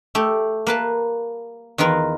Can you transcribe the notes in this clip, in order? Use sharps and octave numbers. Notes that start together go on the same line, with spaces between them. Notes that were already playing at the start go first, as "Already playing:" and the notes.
A3 G4
A#3 B4 A5
E2 D#3 F4 A#4 B4